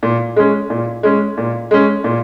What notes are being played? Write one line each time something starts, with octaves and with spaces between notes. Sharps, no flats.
A#2
G#3 C#4
A#2
G#3 C#4
A#2
G#3 C#4
A#2